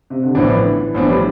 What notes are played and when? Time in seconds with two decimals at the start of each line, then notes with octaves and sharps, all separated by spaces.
0.10 C3
0.23 D3
0.35 A1 A2 E3 F3 B3 D4
0.94 A1 A2 F3 B3 D4
1.09 G3